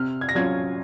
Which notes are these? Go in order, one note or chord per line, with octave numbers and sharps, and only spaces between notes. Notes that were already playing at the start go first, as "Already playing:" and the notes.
Already playing: C3 F6
G#6
A#6
F#3 C#4 F4 G#6